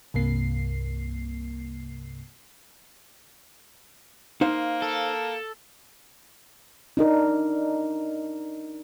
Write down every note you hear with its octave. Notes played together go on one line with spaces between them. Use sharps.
C2 G2 C3 A#3 C7
A#3 D#4 C5 F5
A4
D4 D#4 A#4